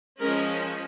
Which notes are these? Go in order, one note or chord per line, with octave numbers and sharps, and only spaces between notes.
F3 G#3 C#4 A#4